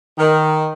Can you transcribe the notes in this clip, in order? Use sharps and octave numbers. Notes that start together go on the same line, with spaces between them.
D#3